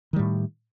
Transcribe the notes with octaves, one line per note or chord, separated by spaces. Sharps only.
A2 D#3 G3